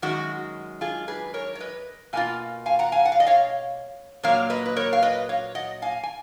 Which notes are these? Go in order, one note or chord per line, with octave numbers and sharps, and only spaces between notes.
F#2 D#3 G#3 F#4
F4 G#4
G#4 B4
A#4 C#5
C#5
B4 D#5
B2 A#3 F4 F5 G#5
F5 G#5
F#5 A#5
F5 G#5
F#5
F5
D#5
C#5 F5
A#2 F#3 A#3 C#5 F5
B4 D#5
B4
A#4 C#5
F5
B4 D#5
C#5 F5
D#5 F#5
F5 G#5
G#5